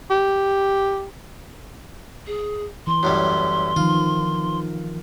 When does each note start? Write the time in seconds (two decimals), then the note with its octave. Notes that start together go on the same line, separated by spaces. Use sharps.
0.10 G4
2.27 G#4
2.87 E3 C6
3.03 F#2 A2 G3
3.76 D#3 F3 F4